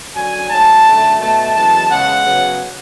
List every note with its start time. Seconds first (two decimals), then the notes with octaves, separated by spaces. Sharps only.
0.14 F#2 D3 F#3 G#5
0.50 G#2 F#3 A3 A5
0.85 F#2 D3 A3
1.19 B2 A3 A5
1.55 F#2 E3 G#3 B3 A5
1.90 C#3 G#3 B3 F#5
2.25 C#3 F#3 B3